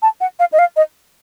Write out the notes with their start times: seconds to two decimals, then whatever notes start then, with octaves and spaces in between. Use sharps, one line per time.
0.02 A5
0.21 F#5
0.39 F5
0.52 D#5
0.59 F5
0.76 D#5